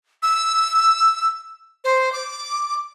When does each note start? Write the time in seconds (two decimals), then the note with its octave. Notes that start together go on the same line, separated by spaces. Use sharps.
0.23 E6
1.84 C5
2.13 D6